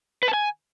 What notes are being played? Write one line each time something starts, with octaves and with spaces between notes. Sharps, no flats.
B4
A5
G#5